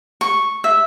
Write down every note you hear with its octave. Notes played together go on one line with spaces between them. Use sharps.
C#6
E5